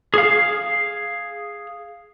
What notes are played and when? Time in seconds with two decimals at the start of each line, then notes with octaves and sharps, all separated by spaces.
0.14 G#4 F5